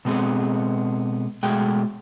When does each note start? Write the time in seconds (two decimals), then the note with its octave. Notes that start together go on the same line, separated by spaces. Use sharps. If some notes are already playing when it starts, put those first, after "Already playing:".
0.05 B2 G#3 B3 C4 G#4 A4
1.43 B2 G#3 A3 G#4 G5